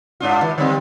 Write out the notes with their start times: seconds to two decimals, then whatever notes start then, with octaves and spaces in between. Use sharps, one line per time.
0.20 G2 D4 F4
0.42 D#3
0.58 D3 G3 C4